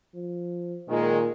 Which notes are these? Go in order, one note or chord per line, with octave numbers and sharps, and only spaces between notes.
F3
A#2 D#3 G#3